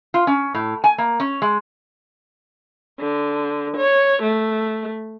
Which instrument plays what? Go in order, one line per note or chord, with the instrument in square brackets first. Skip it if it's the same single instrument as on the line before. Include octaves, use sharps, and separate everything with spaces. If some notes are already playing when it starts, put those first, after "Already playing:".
[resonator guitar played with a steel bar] F4
C#4
A2
G#5
A#3
C#4
G#3
[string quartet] D3
C#5
A3